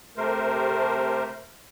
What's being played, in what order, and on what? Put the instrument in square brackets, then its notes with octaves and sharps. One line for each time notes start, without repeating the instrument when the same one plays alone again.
[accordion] C3 A3 A#4 C5